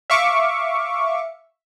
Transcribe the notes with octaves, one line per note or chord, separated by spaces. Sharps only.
E5 F5 C#6 D6